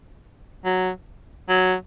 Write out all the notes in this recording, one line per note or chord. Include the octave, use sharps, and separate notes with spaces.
F#3
F#3